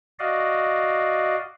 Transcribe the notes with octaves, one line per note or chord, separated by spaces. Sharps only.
F#4 D5 D#5 F5